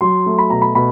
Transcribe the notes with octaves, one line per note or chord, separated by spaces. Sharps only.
F#3 C6
A3
B5
B2 A#5
B5
B2 B5